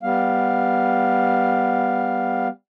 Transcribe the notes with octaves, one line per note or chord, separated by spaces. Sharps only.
G3 B3 F5